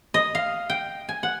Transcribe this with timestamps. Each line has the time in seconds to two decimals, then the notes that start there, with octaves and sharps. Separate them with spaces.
0.14 D#5
0.35 F5
0.70 G5
1.09 G#5
1.23 F#5